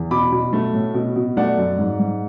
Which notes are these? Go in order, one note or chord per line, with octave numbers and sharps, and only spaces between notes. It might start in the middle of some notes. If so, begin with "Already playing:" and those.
Already playing: E2
B2 B5 D6
B2
A3
A2
B2
B2
A3 D5 F#5
F#2
G#2
G#2